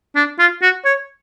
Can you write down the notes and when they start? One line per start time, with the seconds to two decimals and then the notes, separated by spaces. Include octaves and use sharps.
0.16 D4
0.39 F4
0.62 F#4
0.85 C#5